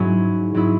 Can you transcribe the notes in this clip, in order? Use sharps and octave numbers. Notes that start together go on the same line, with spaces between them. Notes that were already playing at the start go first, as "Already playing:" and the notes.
Already playing: G#2 F#3 C#4 E4
G#2 F#3 C#4 E4